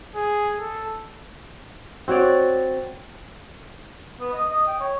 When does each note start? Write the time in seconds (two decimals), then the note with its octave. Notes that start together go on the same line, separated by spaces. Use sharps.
0.15 G#4
0.59 A4
2.08 C4 F#4 C#5 D5
4.20 B3
4.33 D#5
4.50 D#5
4.68 G5
4.80 C#5